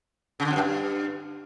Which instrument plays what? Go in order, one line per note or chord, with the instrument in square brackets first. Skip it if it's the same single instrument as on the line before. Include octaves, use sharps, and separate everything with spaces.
[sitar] C#3
D3
F2
F#2
G2